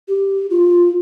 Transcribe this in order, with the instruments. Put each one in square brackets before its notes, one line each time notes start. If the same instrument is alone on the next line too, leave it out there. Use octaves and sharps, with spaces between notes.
[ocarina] G4
F4